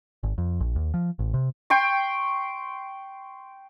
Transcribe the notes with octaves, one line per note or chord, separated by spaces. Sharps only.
G#1
F2
A#1
D#2
F3
A1
C3
G5 C6 C#6